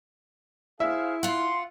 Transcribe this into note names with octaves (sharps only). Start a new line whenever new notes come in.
E4 G#4 C5 E5 F5
F4 F#5 C6